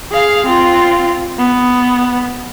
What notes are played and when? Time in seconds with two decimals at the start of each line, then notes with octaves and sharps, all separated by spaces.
0.11 G#4 F5
0.46 C4 F4
1.39 B3